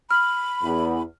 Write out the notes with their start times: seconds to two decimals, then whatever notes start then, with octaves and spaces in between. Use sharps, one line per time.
0.11 B5 F6
0.63 E2